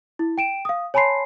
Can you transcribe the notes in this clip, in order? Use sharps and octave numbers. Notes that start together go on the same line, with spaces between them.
E4
G5 D7 E7
F5 D#6
C#5 G#5 A5 B5 C6 C7